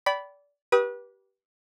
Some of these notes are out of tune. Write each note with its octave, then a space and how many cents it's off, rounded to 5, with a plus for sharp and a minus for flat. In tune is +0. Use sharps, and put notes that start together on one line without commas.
D5 -25 G5 -25 B5 +0
G4 -15 B4 -30 D#6 +20